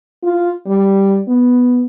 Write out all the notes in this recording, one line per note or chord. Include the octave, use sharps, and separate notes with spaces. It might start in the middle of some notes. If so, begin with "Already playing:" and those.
F4
G3
B3